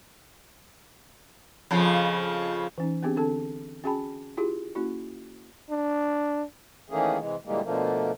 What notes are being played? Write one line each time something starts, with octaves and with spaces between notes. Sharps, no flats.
F2 C#3 F3
E3 C#4 D#4
B3 C4 D4 G4 G#4
D3 C4 D4 A4 A5
C#4 F#4 G#4 G5 A5 B5
E4 F4 G4 G#4
A#3 C#4 E4 F#4
D4
D#3 E3 A3 A#3 C#4 G#4
C3 E3 G#3
A#2 D3 E3 G3 G#3 A#3
B2 D3 F3 A3 A#3